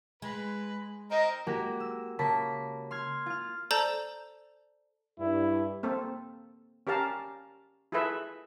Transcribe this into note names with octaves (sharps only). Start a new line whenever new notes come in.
G#3 B4
C4 D#4 A#4 D#5
G#3 A#3 F#4 G4
E6
C#3 A#3 A5 B5 B6
C6 F6 G#6
F4 F6
A4 C5 D5 A5 A#5 G6
G2 E4
A#3 C4 A4
C#4 G4 A#4 F5 A5 A#5
E4 F4 G#4 A4 B4 E5